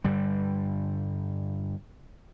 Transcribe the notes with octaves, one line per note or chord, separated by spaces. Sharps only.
G2 D3 G3